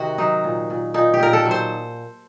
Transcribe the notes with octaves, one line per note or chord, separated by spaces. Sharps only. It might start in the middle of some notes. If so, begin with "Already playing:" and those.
Already playing: C3 D#3 F#4 D#5
F#3 D#4
A#2
A#2
A#2 D#4
G4
A#2 A#4
A4
F#3
C5